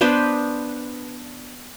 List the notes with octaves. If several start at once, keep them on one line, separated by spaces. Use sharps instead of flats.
B3 D4 B4 C5